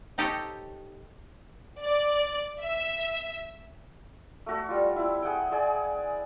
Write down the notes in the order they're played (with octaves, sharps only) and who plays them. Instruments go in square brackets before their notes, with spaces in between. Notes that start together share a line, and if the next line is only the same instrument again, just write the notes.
[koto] C4 D#4 G4 A4 C#5 D#5
[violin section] D5
E5
[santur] A3 F#4 A4
G3 F4
C4 E4
G#4 F#5 G5
G#4 D5 G#5